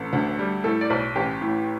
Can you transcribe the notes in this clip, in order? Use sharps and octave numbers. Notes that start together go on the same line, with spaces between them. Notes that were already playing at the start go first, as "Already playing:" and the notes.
Already playing: A1 A4
D2
G3
A2 A4
D5
B1
A1 G4
A2